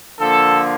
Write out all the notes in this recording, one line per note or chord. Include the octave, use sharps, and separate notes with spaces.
D3 F3 A#3 A4